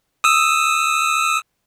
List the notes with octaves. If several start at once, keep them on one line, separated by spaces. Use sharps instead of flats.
D#6 E6